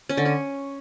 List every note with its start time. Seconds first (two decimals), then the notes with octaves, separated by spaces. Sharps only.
0.09 C#4
0.17 D3
0.25 C#4